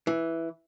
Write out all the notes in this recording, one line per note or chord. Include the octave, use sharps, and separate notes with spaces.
E3